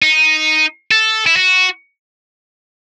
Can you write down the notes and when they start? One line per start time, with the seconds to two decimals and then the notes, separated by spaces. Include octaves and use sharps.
0.02 D#4
0.91 A4
1.26 E4
1.36 F#4